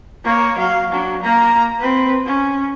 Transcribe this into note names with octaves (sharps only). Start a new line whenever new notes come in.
A#3 C#5
F#3 F5
F#3 D4
A#3 A#5
C4 B4
C#4